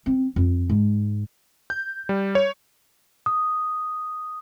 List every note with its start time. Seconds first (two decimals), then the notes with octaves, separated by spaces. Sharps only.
0.06 C4
0.36 F2
0.69 G#2
1.70 G6
2.09 G3
2.35 C#5
3.26 D#6